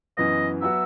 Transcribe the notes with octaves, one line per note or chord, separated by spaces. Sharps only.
F#2 E3 B3 D#5
F#3 B3 F#4 E5